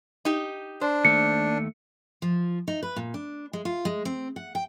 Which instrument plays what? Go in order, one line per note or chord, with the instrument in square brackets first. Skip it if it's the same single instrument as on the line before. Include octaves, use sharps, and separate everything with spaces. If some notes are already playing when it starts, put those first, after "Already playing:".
[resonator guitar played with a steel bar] D#4 G4
[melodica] D4 [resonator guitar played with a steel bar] C5
[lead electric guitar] D#2 A3 [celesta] C#7
[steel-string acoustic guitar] F3
D#4
B4
A#2
D4
G#3
F4
G#3
C4
F#5
G5